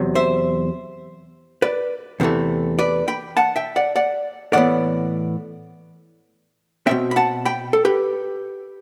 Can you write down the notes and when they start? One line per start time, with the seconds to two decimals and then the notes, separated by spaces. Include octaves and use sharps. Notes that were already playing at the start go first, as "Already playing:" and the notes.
Already playing: E2 C3 F#3
0.15 C5 E5
1.62 B4 D5
2.20 E2 C3 E3 A3
2.79 B4 D5
3.08 G5 B5
3.37 F#5 A5
3.56 E5 G5
3.76 D5 F#5
3.96 D5 F#5
4.53 A2 E3 B3 D5 F#5
6.87 B2 A3 C4 E5 G5
7.11 B5
7.16 F#5 A5
7.45 G5 B5
7.73 A4
7.85 G4 B4